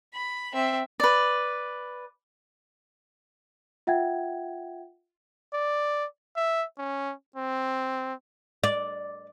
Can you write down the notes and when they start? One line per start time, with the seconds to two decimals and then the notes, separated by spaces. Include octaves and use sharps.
0.14 B5
0.54 C4 E5
1.00 B4 D5
3.87 F4 E5 F#5 G5 G#6
5.53 D5
6.36 E5
6.78 C#4
7.36 C4
8.64 D5